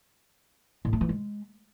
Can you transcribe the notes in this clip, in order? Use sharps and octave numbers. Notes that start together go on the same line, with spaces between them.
A2
A3
E3
G#3